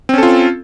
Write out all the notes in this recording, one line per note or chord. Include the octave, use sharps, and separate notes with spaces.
C4 C#4 F4 A4